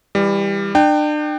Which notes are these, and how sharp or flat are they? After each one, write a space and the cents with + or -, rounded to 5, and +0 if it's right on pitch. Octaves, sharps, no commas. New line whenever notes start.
E3 +0 G3 +20
D4 +40 G5 +0